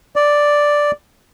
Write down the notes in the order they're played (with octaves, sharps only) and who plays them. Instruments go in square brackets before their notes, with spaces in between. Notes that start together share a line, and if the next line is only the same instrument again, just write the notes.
[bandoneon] D5